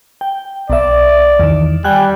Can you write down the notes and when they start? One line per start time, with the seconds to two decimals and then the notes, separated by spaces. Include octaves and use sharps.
0.21 G5
0.70 B1 D5 E5
1.39 E2 D#3
1.84 G3 G5 G#5 F#6